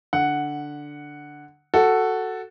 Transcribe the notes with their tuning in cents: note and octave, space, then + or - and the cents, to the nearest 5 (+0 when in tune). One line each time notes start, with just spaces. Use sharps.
D3 +0 F#5 +0
F#4 +5 A4 +5